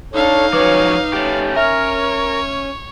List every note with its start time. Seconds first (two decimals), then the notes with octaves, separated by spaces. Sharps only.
0.14 D4 D#4 A4 C#5 F5
0.53 F3 F#3 C#4 B4 C#5 D6
1.13 A3 C#4 G4
1.56 A#4 C#5 E5 F6